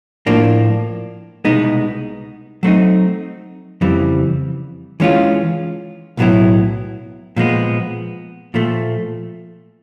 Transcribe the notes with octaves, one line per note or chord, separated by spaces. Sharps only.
A2 F3 A#3 D4
C2 B2 G#3 B3 D#4
F#3 A3 C4 D#4
F2 C#3 E3 G3 C4
E3 G#3 C#4 F4
B1 A2 F#3 B3 E4
A#2 F3 G#3 B3
A#2 F3 A3